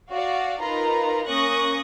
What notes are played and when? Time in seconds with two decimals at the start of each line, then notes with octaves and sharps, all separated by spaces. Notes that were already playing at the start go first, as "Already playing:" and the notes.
0.11 F#4 D5 F5
0.62 D#4 F4 A#4 B4 A#5
1.29 A#3 C#4 C#6 D#6 F#6 A#6